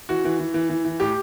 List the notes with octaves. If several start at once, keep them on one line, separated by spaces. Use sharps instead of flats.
E3 F#4
E3
E3
E3
E3
E3
A2 G4